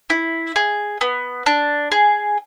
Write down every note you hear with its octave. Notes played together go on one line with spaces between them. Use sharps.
E4
G#4
B3
D4
G#4